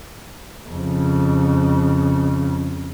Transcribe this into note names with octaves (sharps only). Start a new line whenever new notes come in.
F2 C#3